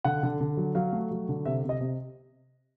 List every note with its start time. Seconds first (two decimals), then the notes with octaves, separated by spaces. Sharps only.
0.05 D3 F#5
0.23 D3
0.41 D3
0.57 F#3
0.75 F#3 F5
0.93 A3
1.11 F#3
1.29 D3
1.45 C3 E5
1.64 C3
1.69 D#5
1.81 C3